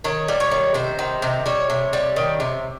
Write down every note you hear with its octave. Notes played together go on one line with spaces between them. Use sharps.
D#3 C#5
G3
C#5
D#3
C3 C5
D#3
C3
G3 C#5
C3
G3
D#3
C3